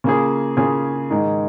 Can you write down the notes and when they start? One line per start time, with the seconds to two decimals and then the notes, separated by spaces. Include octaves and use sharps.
0.04 C#3 A#3 F4 G#4
0.57 C#3 A#3 F4 G#4
1.10 G#2 D#3 G#3